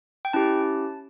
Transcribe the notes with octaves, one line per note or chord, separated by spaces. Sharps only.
G5
C#4 E4 G4 A5